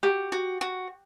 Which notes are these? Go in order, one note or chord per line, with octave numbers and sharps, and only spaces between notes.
F#4 G4
F#4
F#4